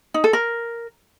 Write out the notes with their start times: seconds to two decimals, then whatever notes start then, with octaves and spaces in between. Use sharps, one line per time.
0.14 D#4
0.24 A4
0.33 A#4